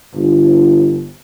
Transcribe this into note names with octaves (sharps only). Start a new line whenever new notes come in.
G1